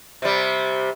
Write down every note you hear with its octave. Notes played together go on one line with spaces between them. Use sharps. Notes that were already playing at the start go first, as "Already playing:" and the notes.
C3 G3